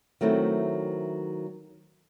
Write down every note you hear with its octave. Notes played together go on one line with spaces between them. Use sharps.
D#3 F#3 A3 C4 E4